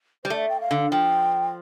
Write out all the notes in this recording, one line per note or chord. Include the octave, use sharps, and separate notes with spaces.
G3 C5
A3 D5
G5
F5
D3
F3 G5